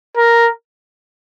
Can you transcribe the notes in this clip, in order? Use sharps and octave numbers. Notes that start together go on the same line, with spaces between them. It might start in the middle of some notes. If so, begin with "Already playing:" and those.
A#4